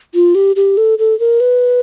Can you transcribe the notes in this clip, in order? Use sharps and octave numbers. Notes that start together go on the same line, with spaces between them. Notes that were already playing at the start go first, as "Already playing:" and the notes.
F4
G4
G4
A4
A4
A#4
B4